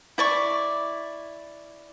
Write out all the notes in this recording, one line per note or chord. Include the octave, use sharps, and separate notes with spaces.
E4 D5 C#6